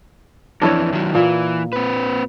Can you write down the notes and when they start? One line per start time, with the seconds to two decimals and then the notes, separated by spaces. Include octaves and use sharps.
0.61 F2 E3 D4 E4 C#5
0.93 D#3 F#3
1.15 A#2 E3
1.73 C4 B4